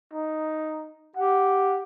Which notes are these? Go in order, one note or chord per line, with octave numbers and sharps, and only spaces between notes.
D#4
G4 F#5